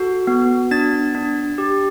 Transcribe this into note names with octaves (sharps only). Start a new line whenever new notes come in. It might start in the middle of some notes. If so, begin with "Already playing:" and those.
Already playing: F#4 A4
B3
D4 A6
D4
G4